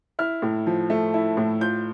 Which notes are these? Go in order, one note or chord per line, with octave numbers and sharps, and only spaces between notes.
E4 F6
A2
F3
A3
E4
A2
F4 G6